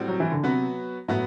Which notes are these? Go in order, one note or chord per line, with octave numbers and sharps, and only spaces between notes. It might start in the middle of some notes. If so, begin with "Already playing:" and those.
Already playing: A2 G3 C4 F#4
F#3
E3
D3
C3 F#3 B3 F#4 B4
A2 F#3 B3 F#4 B4